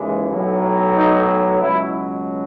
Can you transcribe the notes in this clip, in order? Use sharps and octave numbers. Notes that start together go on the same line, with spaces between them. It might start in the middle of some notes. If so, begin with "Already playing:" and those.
Already playing: D#2 C#3 E3 G#3
B1 A2 F#3
D#4
C#2 B2 F#3 E4